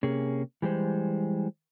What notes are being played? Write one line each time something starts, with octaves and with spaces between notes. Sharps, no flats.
C3 A#3 C#4 G#4
E3 G3 G#3 C5